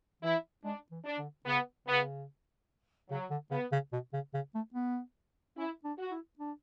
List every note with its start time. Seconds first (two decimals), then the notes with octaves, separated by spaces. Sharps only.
0.22 E3 E4
0.64 G#3 D4
0.91 E3
1.05 D4
1.18 D3
1.46 C#3 B3
1.87 C#3 B3
3.10 C#3 F#3
3.30 D3
3.51 C#3 B3
3.72 C#3
3.92 B2
4.13 C#3
4.34 C#3
4.55 A3
4.74 B3
5.57 C#4 E4
5.84 D4
5.98 F#4
6.11 E4
6.39 D4